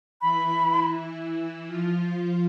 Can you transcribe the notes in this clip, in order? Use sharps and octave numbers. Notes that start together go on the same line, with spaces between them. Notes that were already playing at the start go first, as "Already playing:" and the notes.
E3 E4 B5
F3 F4
F3 F4